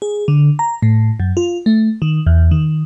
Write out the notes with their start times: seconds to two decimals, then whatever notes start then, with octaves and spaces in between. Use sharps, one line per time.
0.02 G#4
0.28 D3
0.59 A#5
0.82 A2
1.20 F#2
1.37 F4
1.66 A3
2.02 D#3
2.27 E2
2.51 D#3